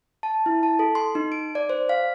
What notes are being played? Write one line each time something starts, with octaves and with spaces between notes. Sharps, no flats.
A5
E4
A5
A4
C6
D#4
D7
D5
C5
F5